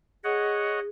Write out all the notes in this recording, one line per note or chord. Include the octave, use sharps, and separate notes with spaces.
G#4 C#5 D#5 F#5